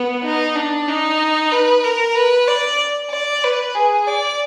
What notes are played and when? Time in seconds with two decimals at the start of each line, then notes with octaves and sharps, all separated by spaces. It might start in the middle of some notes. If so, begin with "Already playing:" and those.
Already playing: B3
0.24 D#4
0.55 D4
0.88 D#4
1.52 B4
1.83 A#4
2.15 B4
2.47 D5
3.11 D5
3.44 B4
3.75 G#4
4.07 D5